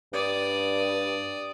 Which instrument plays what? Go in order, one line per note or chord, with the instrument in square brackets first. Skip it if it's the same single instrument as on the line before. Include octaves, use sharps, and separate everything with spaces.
[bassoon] G2 [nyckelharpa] D5 D#6